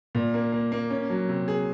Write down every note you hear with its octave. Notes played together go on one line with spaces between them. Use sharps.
A#2
A#3
A#3
A#3
C#4
F#3
C3
G#4